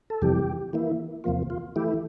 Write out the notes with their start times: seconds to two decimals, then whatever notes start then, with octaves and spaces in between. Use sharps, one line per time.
0.10 A4
0.22 F2 C3 E3 G3 G4
0.73 E3 A#3 E4
1.24 E2 C3 F3 A#3 F4
1.50 F4
1.76 E3 A3 E4 G4